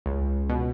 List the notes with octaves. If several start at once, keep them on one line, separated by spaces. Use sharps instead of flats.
C#2
B2